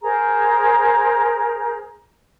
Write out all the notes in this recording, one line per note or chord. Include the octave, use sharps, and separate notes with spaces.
G#4 A#4 C5 A#5